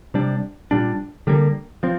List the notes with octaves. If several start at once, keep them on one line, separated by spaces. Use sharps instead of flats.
C3 G3 D4
A#2 G3 D4
D3 G3 A#3
F3 C4